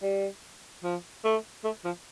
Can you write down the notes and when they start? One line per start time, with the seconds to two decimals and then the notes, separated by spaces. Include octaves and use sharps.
0.02 G3
0.84 F3
1.24 A3
1.64 A3
1.85 F3